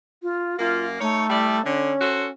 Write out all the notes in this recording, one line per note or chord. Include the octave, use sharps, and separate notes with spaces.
F4
F#2 A#3 F4
A3 D#4 C#5
G3 E4 D5
D3 C#4
F#4 A4 C5